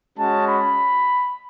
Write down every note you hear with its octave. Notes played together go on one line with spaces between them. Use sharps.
G#3 C#4 F#4 A5
B5